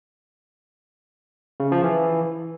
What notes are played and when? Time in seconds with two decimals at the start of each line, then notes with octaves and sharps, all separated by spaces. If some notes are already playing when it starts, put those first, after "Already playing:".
1.60 C#3
1.72 F3
1.84 E3